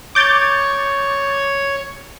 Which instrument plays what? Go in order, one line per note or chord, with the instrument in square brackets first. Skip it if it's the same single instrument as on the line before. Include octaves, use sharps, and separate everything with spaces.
[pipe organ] C#5 [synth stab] D6 G6 A6